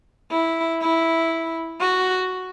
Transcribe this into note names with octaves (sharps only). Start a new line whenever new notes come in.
E4
E4
F#4